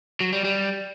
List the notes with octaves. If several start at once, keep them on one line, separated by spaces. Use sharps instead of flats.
F#3
G3
G3